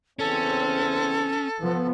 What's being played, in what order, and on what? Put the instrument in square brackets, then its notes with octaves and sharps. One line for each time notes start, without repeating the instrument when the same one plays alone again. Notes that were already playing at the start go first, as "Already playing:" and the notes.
[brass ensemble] E2 C#3 C4 [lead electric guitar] C#4 [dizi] A4
[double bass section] F3 B3